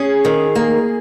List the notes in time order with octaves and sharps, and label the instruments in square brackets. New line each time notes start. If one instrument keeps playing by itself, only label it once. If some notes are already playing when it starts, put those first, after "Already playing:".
Already playing: [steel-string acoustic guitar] C#4 [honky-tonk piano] G#4
[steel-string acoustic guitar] D#3
A#3